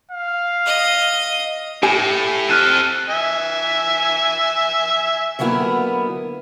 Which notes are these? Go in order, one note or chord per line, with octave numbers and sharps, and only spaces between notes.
F5
D#5
A2 G4 G#5
C4 A4 F6 F#6 D#7
E5 G#5
D3 F#3 A#3 B3 E4 A#4